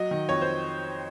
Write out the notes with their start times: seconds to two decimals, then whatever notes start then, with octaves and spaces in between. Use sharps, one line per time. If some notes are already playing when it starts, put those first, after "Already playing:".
Already playing: F#3 D#5
0.11 D#3
0.29 F2 C#5
0.41 C5